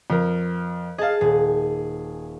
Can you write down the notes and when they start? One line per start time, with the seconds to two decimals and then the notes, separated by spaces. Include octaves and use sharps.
0.10 F2 A#4
0.98 G#4 D#5 F5 A5
1.21 D#1 G#4